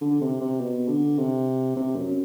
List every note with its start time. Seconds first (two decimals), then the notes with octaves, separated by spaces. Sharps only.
0.01 D3
0.21 C3
0.41 C3
0.60 B2
0.88 D3
1.18 C3
1.76 C3
1.95 F#2